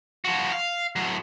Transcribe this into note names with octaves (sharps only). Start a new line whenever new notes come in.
F3 F#4
F5
A2 F#3